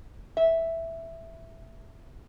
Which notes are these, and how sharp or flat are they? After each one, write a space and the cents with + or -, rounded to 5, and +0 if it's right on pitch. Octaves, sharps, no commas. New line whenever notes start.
E5 +0